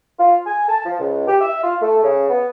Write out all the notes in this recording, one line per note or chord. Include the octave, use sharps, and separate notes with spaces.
F4
G#5
A5
F3
C#2
G4
E5
F4
A3
C#3
B3